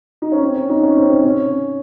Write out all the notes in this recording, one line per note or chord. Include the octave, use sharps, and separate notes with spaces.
D#4
C#4
C4
C#4
D#4
C#4
C4
C4
C#4